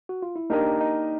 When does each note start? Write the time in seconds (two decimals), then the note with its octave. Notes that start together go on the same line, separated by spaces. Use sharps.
0.09 F#4
0.22 F4
0.36 E4
0.50 A#3 D4 D#4 G4 A#4 D#5
0.81 D#4